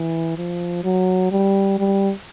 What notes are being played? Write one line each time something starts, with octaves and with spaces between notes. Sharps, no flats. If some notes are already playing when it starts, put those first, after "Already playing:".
Already playing: E3
F3
F#3
G3
G3